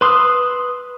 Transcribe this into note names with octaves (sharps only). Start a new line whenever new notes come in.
B4 C6 D#6 E6 F#6